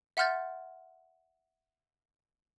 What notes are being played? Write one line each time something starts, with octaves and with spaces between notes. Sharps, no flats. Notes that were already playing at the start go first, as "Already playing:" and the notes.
E5 F#5 C6 F6 G6 A6